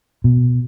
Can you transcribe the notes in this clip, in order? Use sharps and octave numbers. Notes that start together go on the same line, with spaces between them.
B2